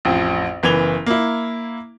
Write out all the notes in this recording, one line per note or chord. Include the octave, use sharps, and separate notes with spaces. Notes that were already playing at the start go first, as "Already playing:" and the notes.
A1 F2
F#1 E3 B3 G#6 F7 G7
A#3 E4